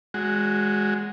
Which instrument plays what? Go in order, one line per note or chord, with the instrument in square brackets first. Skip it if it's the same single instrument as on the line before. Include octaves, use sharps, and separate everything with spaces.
[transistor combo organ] G#3 F#4